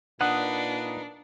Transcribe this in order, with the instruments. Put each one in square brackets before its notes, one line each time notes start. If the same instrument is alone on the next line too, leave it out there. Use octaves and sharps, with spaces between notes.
[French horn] A#2 [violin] D4 [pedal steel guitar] D#4 B4 D#6 [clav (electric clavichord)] F#5